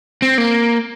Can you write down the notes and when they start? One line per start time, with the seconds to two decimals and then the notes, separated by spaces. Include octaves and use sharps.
0.22 C4
0.38 A#3